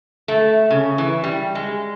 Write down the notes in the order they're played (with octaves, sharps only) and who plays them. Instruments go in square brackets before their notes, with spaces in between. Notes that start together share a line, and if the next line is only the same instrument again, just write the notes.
[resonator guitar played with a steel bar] A3
C#3
E3
G3
G#3